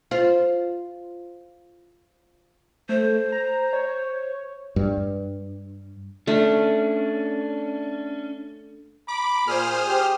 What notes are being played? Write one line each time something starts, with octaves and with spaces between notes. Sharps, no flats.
F4 C5
A3 C5
A#5
C#5
G2
A3 C#4 D4
B5 D6
A#2 G#4 C5 D#6 F6
G4